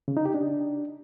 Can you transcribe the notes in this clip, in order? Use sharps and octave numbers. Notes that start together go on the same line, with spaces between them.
C#3
D#4
G4
D4